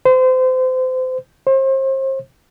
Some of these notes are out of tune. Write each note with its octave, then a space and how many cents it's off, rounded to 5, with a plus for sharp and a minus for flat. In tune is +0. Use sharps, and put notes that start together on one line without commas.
C5 -30
C5 +35